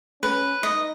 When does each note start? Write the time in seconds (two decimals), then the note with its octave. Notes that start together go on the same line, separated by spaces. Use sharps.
0.22 C#4 B4
0.63 D#4 D#5